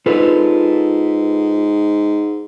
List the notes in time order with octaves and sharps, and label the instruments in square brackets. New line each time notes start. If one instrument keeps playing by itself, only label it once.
[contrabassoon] G#2 [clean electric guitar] F4 A4 B4